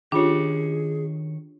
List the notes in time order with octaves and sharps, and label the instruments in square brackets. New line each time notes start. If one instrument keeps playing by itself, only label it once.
[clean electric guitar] D#3 C#5 [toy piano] C#4 F4 G4 [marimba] D4 [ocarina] G#4